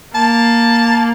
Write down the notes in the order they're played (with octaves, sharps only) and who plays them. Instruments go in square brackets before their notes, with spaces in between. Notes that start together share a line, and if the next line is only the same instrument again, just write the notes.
[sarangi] A#3 [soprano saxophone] A5